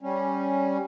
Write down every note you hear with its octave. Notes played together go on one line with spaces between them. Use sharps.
G3 C#4